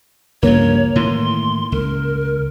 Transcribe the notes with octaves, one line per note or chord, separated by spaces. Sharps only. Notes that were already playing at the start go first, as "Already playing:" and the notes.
C#2 G2 F3 A#3 C#5
A2 D#3 E3 C6
C#2 A#4